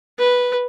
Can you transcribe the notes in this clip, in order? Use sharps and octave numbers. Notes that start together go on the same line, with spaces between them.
B4